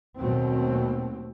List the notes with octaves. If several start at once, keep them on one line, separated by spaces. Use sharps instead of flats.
D#2 B2 F#3 A3 C4